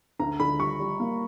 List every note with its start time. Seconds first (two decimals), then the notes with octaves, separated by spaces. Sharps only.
0.19 D2 A#5
0.40 D3 B5
0.59 G3 C#6
0.80 G3
1.00 A#3